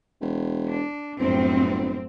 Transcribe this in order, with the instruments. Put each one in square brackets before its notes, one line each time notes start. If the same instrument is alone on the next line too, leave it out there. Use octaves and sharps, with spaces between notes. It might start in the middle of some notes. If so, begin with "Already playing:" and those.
[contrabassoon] E1
[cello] D4
[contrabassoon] G1 [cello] F#2 A2 [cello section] C4